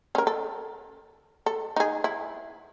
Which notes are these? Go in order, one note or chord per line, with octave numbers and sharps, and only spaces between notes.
C#4 A#4
A4
A4
D#4 G#4
E4